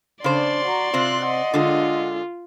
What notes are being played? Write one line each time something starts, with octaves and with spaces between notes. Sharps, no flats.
C#3 D4 C5 D5 C6
F#4 A#5
C3 C4 F4 C5 F#6
D#5 F#5
D3 G#3 F4